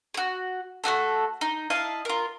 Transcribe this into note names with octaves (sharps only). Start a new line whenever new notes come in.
F#4 G#4
A3 A#3 F#4 A4
D#4
E4 D#5 F5 A5
F4 A#4